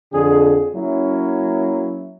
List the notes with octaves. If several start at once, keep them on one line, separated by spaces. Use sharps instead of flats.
F2 D3 G#4
F#3 A#3 C#4 E4